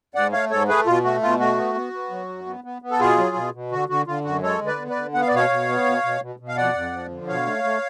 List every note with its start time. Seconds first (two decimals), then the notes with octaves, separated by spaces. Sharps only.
0.15 G#2 D5 F#5
0.32 A3 C#5 F5
0.50 G#2 A4 C#5
0.68 A3 G#4 B4
0.86 B2 F4
1.04 A3 F#4
1.21 B2 F4
1.40 A3 F#4
1.57 B3
1.75 B3
1.93 B3
2.11 F#3
2.29 F#2
2.46 B3
2.64 B3
2.82 B3
2.91 A4
3.00 B2 F4 G#4
3.18 F#3
3.36 B2
3.54 B2
3.72 D3 F#4
3.89 D3 F#4
4.07 D3 F4
4.25 F#2 F#4
4.43 G#3 A4 C#5
4.61 D3
4.67 B4 D5
4.78 B3
4.90 B4 D5
4.96 D3
5.14 B3 F#5
5.21 F5
5.28 D5
5.32 B2 C#5 F5
5.50 B2
5.68 B3
5.86 B2
6.03 B2
6.21 B2
6.39 B2
6.48 F5
6.57 F2 D5 F#5
6.74 F2
6.93 F3
7.10 D3
7.28 B2 C#5 F5
7.46 A3
7.64 A3